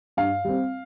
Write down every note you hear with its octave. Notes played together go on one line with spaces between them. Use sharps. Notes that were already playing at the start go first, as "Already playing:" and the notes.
G2 F5
G3 C4